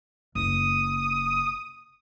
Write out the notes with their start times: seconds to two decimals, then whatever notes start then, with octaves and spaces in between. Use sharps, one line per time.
0.35 F#1 D#6